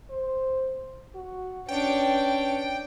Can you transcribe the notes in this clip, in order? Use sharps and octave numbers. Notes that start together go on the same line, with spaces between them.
C5
F#4
C#4 D4 B4 G5